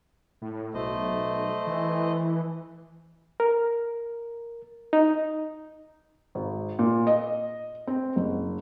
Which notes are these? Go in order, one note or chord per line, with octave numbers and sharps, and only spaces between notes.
A2
B1 A3 C5 D#5
E3
A#4
D#4
G#1
A#2
D#5
C4
F#1